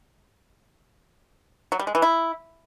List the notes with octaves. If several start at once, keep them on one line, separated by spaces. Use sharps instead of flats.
F#3
G3
G#3
E3
E4